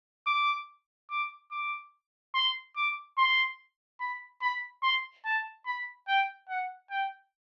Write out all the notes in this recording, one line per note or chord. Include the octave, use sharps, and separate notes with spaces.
D6
D6
D6
C6
D6
C6
B5
B5
C6
A5
B5
G5
F#5
G5